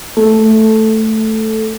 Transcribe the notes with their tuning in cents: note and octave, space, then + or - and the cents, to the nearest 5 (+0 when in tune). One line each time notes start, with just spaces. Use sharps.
A3 +0 A4 -5